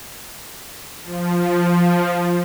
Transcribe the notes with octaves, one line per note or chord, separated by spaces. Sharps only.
F3
F3